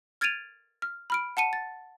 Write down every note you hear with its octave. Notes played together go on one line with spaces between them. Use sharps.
F6 G#6 A6 D7 D#7 F7
F6
B5 F6 D7
F#5 A5 C#7 D#7
A6